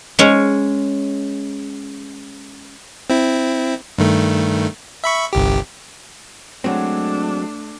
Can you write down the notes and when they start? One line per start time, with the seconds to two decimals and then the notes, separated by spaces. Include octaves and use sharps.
0.19 G#3 C#4 C#5
3.10 C4 E4
3.98 G2 D#3 A3
5.04 E5 B5 C#6
5.33 G1 C2 G4
6.64 F#3 G#3 A3 C4 D4